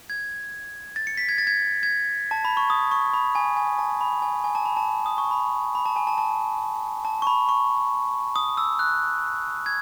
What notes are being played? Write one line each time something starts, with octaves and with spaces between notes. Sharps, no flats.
G#6
A6
C#7
B6
G#6
A6
G#6
G#6
A5
B5
C#6
D#6
C#6
B5
G#5
G#5
A5
B5
G#5
G#5
A5
B5
A5
D#6
C#6
B5
B5
A5
G#5
A5
A5
A5
C#6
B5
C#6
D#6
E6
F#6
G#6